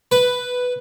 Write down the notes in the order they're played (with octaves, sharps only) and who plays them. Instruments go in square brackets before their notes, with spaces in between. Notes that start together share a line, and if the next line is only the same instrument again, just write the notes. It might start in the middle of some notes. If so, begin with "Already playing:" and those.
[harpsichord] B4